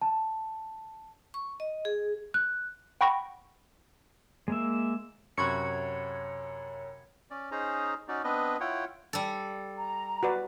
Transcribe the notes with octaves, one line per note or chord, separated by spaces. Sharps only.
A5
C#6
D#5
G#4
F#6
F#5 G5 B5 C#6 A#6
G#3 A#3 E5
F#2 C3 F#4 C#5 B5 C#6 G#6 C#7
C#4 D5
C#4 D#4 G#4 C5 A#5
C#4 D#4 F#4 D5
B3 C4 D4 B4 D#5
E4 F4 C#5 F#5 G5
G3 A4
A#5
F#4 B4 D5